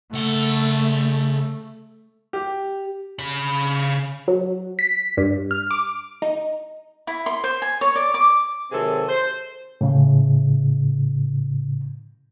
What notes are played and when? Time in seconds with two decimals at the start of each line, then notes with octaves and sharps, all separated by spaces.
0.14 C#3 A3 F#5
2.33 G4
3.19 C#3 B5
4.28 F#3
4.79 B6
5.17 G2
5.51 F6
5.71 D6
6.22 D#4
7.07 E4
7.26 C6
7.44 C5
7.62 G#5
7.81 C#5
7.96 D5
8.14 D6
8.72 C3 D#3 F#3 C4 G#4 A4
9.08 C5
9.81 A2 C#3